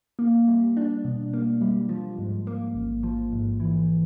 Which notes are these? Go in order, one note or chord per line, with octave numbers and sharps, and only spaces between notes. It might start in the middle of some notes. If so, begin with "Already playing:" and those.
A#3
G3
D4
B2
A#3
G3
F3
G#2
A#3
A1
F3
G#2
E3